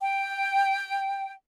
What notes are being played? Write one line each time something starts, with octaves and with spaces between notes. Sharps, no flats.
G5